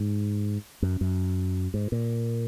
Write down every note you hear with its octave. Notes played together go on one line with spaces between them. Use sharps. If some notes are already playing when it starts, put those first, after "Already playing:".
Already playing: G#2
F#2
F#2
G#2
A#2